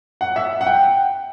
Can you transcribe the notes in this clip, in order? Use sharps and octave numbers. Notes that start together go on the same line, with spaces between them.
F#5
E5
F#5
G5